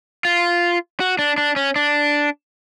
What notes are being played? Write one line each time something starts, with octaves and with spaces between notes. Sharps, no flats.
F4
F#4
D4
D4
C#4
D4